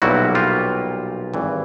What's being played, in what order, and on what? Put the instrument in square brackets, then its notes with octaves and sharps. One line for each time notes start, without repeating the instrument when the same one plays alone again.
[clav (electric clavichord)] B1 A#2 G3 E4 F#4
F4 G4
G#1 G2 E3